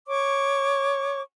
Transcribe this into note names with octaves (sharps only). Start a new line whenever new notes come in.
C#5 C#6 D6